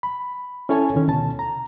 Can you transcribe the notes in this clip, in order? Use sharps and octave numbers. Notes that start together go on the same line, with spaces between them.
B5
C#4 E4 A4 C#5 G#5 A5
C3 D#3 C#4
D2 B2 A5
A#5